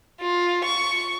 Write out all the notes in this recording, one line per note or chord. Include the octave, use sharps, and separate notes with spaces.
F4
C#6